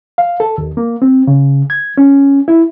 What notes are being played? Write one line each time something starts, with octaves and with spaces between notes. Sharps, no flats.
F5
A4
D#2
A#3
C4
C#3
G#6
C#4
E4